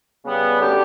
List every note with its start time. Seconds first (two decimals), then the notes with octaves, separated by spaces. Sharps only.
0.24 C#3 G3 B3
0.59 F#2 D3 A3 D4 G4